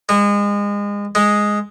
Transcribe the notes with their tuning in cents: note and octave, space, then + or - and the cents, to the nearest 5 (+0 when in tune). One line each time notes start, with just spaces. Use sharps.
G#3 -30
G#3 +0